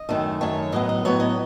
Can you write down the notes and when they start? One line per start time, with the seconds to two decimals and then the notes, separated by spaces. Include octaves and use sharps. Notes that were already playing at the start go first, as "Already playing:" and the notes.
Already playing: D#5
0.09 F#2 D#3 A3
0.41 F#2 D#3 A3 C#5
0.72 A2 F#3 B3 D#5
0.89 D#5
1.05 A2 F#3 B3 C#5
1.20 D#5